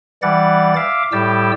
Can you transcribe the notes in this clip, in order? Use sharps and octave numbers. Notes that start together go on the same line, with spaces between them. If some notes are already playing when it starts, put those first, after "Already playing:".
E3 G3 D5 F#5 A6
E5 F5 D6
A2 G3 G4 G5 A5 E6